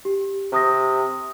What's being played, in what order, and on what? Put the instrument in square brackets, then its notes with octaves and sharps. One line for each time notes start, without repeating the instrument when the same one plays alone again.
[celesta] G4
[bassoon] C3 [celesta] C#6 D#6 A#6